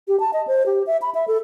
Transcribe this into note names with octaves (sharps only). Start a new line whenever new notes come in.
G4
A5
D#5
C5
G4
E5
B5
E5
A4